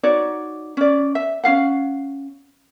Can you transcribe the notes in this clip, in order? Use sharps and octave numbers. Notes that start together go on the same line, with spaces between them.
D#4 F#4 C#5 D5
C#4 D5
E5
C#4 F4 F5 F#5